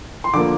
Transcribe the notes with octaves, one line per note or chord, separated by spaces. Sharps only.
C6
D3 F3 A#3 D6